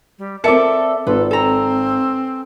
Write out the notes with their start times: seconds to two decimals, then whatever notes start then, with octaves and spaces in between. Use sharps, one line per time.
0.18 G3
0.44 C4 A4 A#4 D5 E5 A5 D6 C#7
1.07 G#1 F4 A4 B4
1.31 C4 A4 G#5 A#5